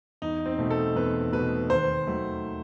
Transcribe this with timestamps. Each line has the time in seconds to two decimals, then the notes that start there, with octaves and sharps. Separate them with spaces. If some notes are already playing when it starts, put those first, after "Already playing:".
0.22 E2 D#4
0.46 C4
0.58 B2 A3
0.70 A4
0.96 E2 B4
1.33 B2 A3 B4
1.70 D#2 C5
2.07 D#3 F#3 A3